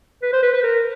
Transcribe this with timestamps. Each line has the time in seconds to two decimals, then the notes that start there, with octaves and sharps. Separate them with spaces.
0.22 B4
0.33 C5
0.43 B4
0.54 B4
0.63 A#4